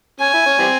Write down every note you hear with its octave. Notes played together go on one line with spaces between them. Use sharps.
C#4 G#5
E4
C#4
E3 G3 C4